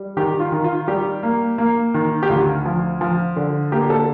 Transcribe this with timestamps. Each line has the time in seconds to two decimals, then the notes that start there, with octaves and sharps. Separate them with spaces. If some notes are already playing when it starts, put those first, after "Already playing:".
Already playing: G3
0.17 D#3 G4
0.40 F4
0.52 D#3
0.64 F4
0.88 G3 G4
1.23 A#3
1.58 A#3
1.94 D#3
2.23 G4
2.30 D2 F4
2.65 F3
3.01 F3
3.36 D3
3.72 A#3 G4
3.90 A4